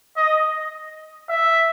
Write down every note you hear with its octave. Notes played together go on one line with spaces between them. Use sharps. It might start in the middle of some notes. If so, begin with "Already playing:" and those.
D#5
E5